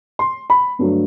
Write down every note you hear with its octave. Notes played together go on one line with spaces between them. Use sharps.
C6
B5
G2 D3 F#3 A3